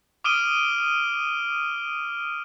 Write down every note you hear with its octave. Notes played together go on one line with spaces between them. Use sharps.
D6 D#6 F6 D7 D#7 G7